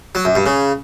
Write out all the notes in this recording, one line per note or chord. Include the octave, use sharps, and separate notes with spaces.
F#3
F#2
G2
C#3